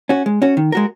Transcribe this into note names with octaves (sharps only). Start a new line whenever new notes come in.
C#4 F#4
G#3
C#4 F#4
D#3
G#3 F#4 A#4